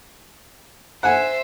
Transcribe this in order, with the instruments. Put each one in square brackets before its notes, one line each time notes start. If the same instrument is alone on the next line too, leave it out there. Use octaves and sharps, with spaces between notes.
[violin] C5 E5 [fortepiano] F#5 G#5